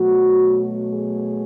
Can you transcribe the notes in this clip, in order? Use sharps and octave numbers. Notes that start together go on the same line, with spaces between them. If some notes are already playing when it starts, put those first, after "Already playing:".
Already playing: B2 F#3 A3 F#4
G#4